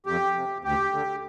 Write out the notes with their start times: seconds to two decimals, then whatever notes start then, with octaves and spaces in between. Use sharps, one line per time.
0.06 F2 G4
0.35 C3
0.64 D2 G4
0.93 D3